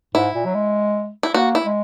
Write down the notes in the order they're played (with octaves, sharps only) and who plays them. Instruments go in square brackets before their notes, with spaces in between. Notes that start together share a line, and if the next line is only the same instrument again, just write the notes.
[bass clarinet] G#2 [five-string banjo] E4
[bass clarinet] A#2
F#3
G#3
[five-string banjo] E4
[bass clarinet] A#3 [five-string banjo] F#4
[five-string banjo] E4
[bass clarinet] G#3